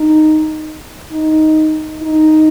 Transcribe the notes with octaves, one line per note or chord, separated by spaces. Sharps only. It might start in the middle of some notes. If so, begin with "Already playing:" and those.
Already playing: D#4
D#4
D#4